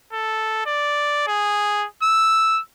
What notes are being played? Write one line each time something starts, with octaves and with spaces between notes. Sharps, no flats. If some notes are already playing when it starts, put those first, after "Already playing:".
A4
D5
G#4
E6